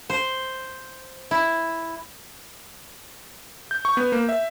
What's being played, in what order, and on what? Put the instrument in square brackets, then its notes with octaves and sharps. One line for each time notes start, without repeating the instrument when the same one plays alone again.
[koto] C5
E4
[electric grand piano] G6
C#6
B3
A#3
E5